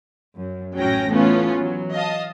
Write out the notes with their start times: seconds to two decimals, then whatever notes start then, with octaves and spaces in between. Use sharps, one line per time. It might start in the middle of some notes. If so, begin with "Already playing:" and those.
0.38 F#2
0.77 A1 A2 F#3 C#4 G5 A#6
1.11 E3 A3 B3 C#4 F4
1.61 E3 F#3
1.94 D#5 F5 A5 D#6